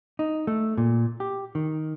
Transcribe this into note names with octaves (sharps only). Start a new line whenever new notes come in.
D#4
A3
A#2
G4
D#3